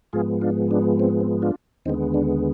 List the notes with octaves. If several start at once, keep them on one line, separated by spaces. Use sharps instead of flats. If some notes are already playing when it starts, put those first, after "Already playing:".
G#2 F3 G#3 B3 F4 G#4
D4 F4
D4
C4
C4
D4 F4
D#2 D3 G#3 B3 C4 D#4
D4